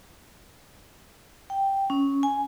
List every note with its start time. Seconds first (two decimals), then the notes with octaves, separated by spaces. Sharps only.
1.50 G5
1.90 C#4
2.23 G#5